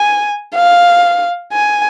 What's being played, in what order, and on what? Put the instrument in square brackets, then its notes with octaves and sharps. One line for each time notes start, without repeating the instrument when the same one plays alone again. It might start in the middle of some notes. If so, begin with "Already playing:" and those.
Already playing: [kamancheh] G#5
F5
G#5